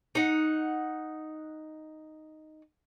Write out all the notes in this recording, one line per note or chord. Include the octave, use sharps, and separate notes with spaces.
D#4 F#5